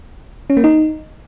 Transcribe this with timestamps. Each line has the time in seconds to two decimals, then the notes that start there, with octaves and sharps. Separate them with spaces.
0.50 C#4
0.57 A#3
0.64 D#4